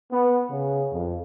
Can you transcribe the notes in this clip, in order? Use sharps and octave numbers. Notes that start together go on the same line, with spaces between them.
B3
C#3
F2